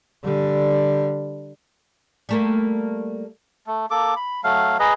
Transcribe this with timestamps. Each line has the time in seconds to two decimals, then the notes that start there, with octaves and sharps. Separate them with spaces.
0.24 D3 G3
2.29 G3 A3 A#3
3.67 A3
3.91 A#3 A4 D6
4.16 B5
4.44 F#3 A3 F5
4.79 G#4 B4 D#5 A#5